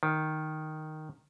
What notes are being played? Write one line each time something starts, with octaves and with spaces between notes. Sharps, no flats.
D#3